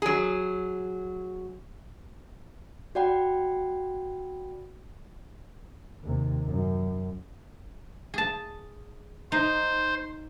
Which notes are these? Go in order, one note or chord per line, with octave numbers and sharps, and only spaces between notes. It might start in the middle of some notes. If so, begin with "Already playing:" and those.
F#3 G#4
F#4 D5 F#5 G5 B5
D#2 C3
F#2
G#4 A5
D#4 C5